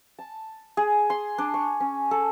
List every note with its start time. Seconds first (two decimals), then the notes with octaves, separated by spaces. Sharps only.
0.19 A5
0.77 G#4
1.10 C6
1.38 D4
1.54 C#6
1.80 C#4
2.11 A4